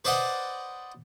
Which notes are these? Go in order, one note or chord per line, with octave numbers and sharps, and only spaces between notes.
B4 C5 D5 D#5 F#5